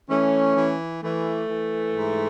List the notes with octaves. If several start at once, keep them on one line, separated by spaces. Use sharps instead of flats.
E3 A3 C#4
E3
E3 A3
E3
G#2